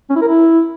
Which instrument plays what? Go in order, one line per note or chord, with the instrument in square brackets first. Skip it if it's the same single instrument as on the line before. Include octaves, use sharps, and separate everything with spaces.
[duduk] C#4
E4
A#4
E4